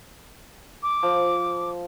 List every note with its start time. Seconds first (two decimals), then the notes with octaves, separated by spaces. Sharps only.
0.83 D6
1.03 F3